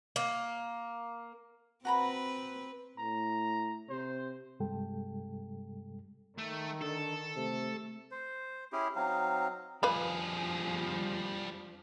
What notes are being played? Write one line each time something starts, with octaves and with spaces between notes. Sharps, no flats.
A#3
C4 F#4 B4 A#5 B5
A2 A#5
C3 C5
G2 C3 G3 G#3 A4 G5
D#3 A3
D3 A4
C3 A3
C5
C#4 E4 G4 G#4
F#3 C4 D#4 F5
F2 F3 G3 D4 G#4 B4 F5 B5